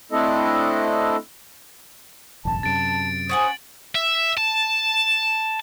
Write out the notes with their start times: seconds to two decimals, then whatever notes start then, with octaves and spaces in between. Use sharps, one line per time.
0.12 A3 C4 D4 E4 A4 D#5
2.45 E1 A1 F#2 A5
2.63 F#2 C3 A6 D7
3.29 C#4 C5 F#5 G#5 D#6 A6 F#7
3.95 E5
4.38 A5